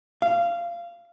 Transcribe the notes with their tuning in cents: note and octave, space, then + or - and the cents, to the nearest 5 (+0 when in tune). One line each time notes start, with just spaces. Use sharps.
F5 -20